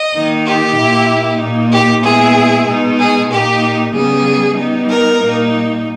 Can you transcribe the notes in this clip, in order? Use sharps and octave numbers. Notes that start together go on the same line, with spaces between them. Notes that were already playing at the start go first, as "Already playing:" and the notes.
Already playing: D#5
D#3 A#3 D#4
G4
A#2 A#3 E4
A#2 A#3 D#4
G4
A#2 G#3 B3 E4 G#4
B2 G#3 D#4
G#4
A#2 A#3 D#4 G4
C#3 G3 B3 G#4
G3 B3 D#4
A#4
A#2 G3 A#3 D#4